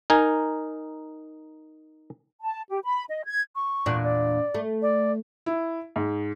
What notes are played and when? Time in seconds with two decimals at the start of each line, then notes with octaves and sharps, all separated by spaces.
0.10 D#4 A#4 G#5
2.41 A5
2.71 G4
2.84 B5
3.10 D#5
3.25 G#6
3.55 C#6
3.86 E2 A#2 D4
4.04 D5
4.54 A3
4.82 D5
5.46 E4
5.96 G#2